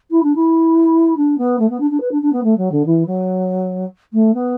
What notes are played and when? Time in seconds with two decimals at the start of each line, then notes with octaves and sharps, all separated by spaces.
0.11 E4
0.23 D4
0.35 E4
1.17 D4
1.38 B3
1.59 A3
1.70 B3
1.80 D4
1.90 D4
2.00 B4
2.11 D4
2.22 D4
2.32 B3
2.43 A3
2.57 F#3
2.72 D3
2.86 E3
3.06 F#3
4.13 A3
4.34 B3